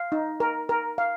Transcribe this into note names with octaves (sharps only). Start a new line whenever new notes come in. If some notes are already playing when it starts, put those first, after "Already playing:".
Already playing: F5
D#4
A#4
A#4
F5